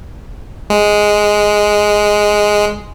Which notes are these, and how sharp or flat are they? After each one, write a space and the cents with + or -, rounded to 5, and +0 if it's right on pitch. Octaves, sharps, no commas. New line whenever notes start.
G#3 +0